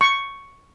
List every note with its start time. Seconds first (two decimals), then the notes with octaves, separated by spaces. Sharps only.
0.01 C#6